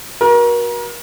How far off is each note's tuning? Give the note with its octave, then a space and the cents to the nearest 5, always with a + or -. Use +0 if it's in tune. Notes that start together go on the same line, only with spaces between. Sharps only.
F#4 +0 A#4 +35